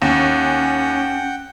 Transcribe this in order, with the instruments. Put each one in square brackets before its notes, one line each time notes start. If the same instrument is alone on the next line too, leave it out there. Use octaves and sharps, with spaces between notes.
[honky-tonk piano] D#2 [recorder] C#4 [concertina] F#5 G5